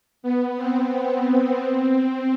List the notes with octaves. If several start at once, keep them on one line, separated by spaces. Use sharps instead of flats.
B3
C4
C4